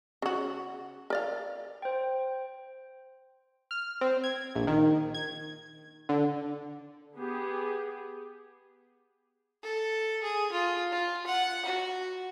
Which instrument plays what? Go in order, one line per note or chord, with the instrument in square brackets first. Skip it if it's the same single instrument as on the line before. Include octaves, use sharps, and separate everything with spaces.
[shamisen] C#3 F#4
A#4 D5 F5
[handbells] C5 G5
[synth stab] F6
C4
G#6
A#1
D#3
G#6
D3
[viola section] B3 G4 G#4
[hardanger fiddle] A4
G#4
F4
F4
F#5
F#4